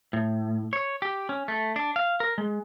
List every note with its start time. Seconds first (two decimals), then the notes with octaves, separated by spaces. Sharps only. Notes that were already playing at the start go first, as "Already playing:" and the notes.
0.13 A2
0.73 C#5
1.02 G4
1.29 C#4
1.48 A3
1.76 D4
1.96 F5
2.20 A#4
2.38 G#3